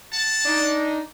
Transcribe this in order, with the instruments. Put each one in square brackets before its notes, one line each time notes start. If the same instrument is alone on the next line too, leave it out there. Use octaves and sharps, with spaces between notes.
[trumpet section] F#5 A5
[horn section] D4 D#4